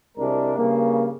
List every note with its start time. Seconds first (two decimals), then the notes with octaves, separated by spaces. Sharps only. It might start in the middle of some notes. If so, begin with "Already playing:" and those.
0.18 C2 C3 G#3 D4 A#4
0.56 G2 C#3 A#3